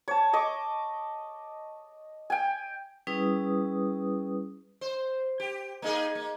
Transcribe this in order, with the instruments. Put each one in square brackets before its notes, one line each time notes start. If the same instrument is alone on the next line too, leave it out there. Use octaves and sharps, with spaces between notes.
[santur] C#5 A5
D#5 C#6 D6
G5 G#5
[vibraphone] G3 C#4 E4 G#4 B4 D#6
[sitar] C5
G4
A#3 D#4 G#4
A#3